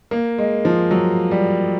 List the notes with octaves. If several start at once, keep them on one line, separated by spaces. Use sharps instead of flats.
A#3
G#3
F3
F#3
G3